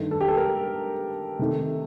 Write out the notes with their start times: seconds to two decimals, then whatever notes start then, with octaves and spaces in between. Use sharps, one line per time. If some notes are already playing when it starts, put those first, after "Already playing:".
Already playing: G2 D#3 A3
0.11 A4
0.21 G4
0.28 A4
0.37 A#4
1.39 C3 D#3 A3